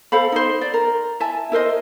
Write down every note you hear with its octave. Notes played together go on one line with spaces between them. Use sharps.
A4 C5 F5 B5
D#4 C5
D5
A#4
E4 E5 G#5 A5
E4 A#4 C5 D#5